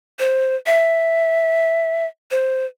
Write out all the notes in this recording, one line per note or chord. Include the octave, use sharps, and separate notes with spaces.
C5
E5
C5